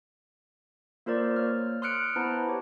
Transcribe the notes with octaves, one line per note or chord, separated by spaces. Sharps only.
A#3 F4 A#4 C5 D5
A#3 C#5 F6
C6 D#6 F6 F#6 C#7 D7
B3 E4 B4 C5 A5 A#5
E4 G4 C#5